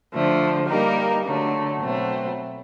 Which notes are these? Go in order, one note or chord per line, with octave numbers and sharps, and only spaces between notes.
D3 F3 A3
G3 A#3 D#4 G4 A#4
D3 F#3 A3
B2 F#3 A3 C4